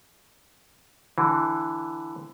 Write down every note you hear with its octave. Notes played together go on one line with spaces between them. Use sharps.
D3 E3